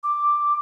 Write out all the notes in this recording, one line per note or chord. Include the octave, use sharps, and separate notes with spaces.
D6